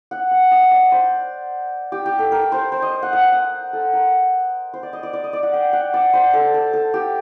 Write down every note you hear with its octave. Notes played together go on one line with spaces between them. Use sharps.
F#5
F#5
D#5
D5
C5
G4
G4
A4
A#4
C5
C5
D#5
F#5
F#5
F#5
A4
A#4
C5
D5
D#5
D5
D5
D#5
D5
F#5
G5
F#5
D5
C5
A4
A4
A4
G4